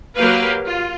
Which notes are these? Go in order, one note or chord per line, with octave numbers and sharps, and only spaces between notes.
F#3 A#3 G4 B4 F5
F4